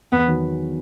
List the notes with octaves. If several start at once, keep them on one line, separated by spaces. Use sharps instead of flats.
E2 B3
D#3 F#3